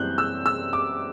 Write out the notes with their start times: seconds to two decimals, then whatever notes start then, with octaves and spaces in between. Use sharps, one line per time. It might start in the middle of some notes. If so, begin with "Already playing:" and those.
Already playing: F#2 E3 G3 C4 F#6 G6
0.18 E6
0.46 E6
0.73 D6